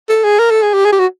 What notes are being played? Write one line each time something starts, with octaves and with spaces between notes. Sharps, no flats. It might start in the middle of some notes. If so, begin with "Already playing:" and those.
A4
G#4
A#4
A4
G#4
G4
G#4
G4
F#4